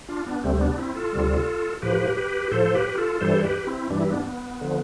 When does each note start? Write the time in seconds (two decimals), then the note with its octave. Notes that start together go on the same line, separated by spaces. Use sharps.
0.09 D4 F4
0.26 B3 D4
0.43 D2 C3 G3 A3 C4
0.61 B3 D4
0.78 C4 E4
0.95 F4 A4
1.13 D2 C3 G3
1.82 A2 F3 G4 B4
2.17 G4 B4
2.51 A2 F3 A4 C5
2.65 C5
2.75 G4 B4
2.97 F4 A4
3.21 G2 E3 G3 A4 C5
3.44 G4 B4
3.67 C4 E4
3.90 G2 E3 G3 D4
4.00 E4
4.10 B3 D4
4.25 B3
4.61 D3 F3